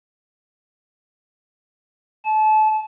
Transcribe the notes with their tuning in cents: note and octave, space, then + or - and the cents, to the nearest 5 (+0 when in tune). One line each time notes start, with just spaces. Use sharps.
A5 -30